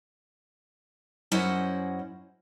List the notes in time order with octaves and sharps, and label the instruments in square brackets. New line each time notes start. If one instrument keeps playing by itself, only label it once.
[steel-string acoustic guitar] F#2 C#4 E4 C5 D#5 F#5